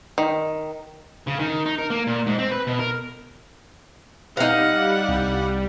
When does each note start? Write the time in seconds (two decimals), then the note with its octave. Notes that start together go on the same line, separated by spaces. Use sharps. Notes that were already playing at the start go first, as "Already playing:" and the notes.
0.18 D#3
1.27 C#3
1.39 D#3
1.66 D#4
1.78 A#4
1.90 A#3
2.07 A#2
2.26 G#2
2.39 C4
2.51 B4
2.67 B2
2.79 A#4
4.37 G3 D#4 F5 F#5
5.08 C2